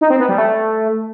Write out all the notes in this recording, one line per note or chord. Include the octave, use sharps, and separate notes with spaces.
D#4
C4
B3
G3
A3